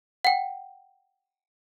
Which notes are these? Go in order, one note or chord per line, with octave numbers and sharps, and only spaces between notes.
F#5 G5